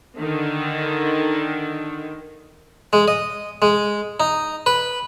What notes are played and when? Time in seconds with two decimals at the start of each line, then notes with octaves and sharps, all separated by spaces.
0.18 D3 D#3
2.93 G#3
3.08 D#5
3.62 G#3
4.20 D#4
4.66 B4